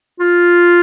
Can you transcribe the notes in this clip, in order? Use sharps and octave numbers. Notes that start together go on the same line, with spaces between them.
F4